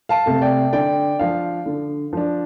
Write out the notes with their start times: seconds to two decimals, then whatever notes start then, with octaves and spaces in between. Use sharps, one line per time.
0.09 F5 A5
0.26 C3 A3
0.41 D5 G5
0.73 D3 D5 G5
1.19 F3 D4 F5
1.66 D3
2.13 F3 D4